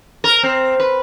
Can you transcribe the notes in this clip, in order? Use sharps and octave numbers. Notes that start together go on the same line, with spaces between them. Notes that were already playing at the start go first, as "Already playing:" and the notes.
A#4
C4
B4